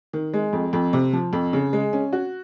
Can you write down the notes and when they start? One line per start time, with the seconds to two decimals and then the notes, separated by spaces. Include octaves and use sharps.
0.13 D#3
0.34 G#3
0.53 F2
0.73 F2
0.93 C3
1.13 F3
1.33 F2
1.53 C#3
1.73 G#3
1.93 C#4
2.13 F#4